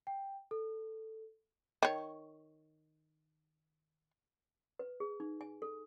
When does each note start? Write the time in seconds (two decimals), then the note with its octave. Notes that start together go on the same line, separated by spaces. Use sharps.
0.07 G5
0.51 A4
1.83 D#3 C#5
4.79 B4
5.00 G#4
5.20 D#4
5.41 G#5
5.62 A4